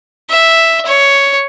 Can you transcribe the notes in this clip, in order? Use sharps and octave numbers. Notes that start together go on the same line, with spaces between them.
E5
C#5